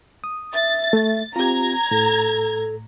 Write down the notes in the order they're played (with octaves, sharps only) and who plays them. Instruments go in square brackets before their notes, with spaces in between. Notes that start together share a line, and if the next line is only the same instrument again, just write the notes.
[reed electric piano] D#6
[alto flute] E5 [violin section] A6
[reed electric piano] A3
[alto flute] C4 [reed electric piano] F4 G4 [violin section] A#5 G#6
[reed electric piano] A2 [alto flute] A4